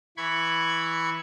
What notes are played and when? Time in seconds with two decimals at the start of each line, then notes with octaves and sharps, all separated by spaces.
0.17 E3 B5 C#6 G#6